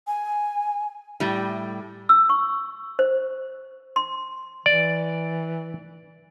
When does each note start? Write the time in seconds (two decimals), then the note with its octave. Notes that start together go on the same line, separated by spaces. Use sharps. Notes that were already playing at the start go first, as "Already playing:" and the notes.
0.07 G#5
1.20 A2 G3
2.09 E6
2.29 C#6
2.99 C5
3.96 C6
4.66 E3 D5